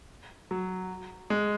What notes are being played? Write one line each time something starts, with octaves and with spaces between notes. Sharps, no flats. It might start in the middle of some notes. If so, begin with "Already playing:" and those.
F#3
G#3